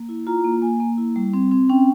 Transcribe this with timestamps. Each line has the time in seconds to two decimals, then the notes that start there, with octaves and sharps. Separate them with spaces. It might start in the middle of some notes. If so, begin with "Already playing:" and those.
Already playing: A#3
0.09 E4
0.27 F4 A#5
0.44 A#3
0.62 A#3 G#5
0.80 A#3
0.98 E4
1.16 G3
1.33 C4
1.51 C4
1.70 C#4 G5